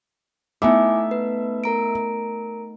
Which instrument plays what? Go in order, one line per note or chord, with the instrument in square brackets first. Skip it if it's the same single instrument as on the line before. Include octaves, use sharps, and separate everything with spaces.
[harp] A3 B3 D#4 [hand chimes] E4 G#5 D6 [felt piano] E5
[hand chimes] B4
A#4 A#5 D7